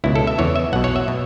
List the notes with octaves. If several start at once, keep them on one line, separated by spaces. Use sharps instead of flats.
C#2 B2 E4
A4
E5
E2 E3 C#5
E5
B1 B2 F#5
C#5
E5
B2